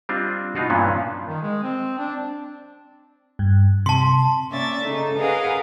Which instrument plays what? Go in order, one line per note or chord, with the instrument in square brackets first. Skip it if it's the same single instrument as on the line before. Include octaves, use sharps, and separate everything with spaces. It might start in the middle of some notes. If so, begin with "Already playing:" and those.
[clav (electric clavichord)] G3 C4 D4 F4 C5 D#5
B2 D#4 F4 F#4
G2 A#2 E3 B3 C#4 D4
[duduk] D#3
G#3
C4
D4
[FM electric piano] G2
[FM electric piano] C3 [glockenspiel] A5 C6
[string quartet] A#3 C#4 D5 E5 A6
C#3 D#4 A4
G#4 A#4 B4 D#5 F5 F#5